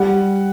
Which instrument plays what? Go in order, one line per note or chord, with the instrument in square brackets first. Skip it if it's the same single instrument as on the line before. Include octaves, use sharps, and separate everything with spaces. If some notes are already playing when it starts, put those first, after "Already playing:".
Already playing: [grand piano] G3 F#5